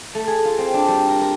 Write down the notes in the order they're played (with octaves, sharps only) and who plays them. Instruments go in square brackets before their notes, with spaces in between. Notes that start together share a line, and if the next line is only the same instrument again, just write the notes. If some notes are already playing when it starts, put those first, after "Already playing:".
[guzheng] A3
G#4
F4
C4
D4
G3
A#4
A#4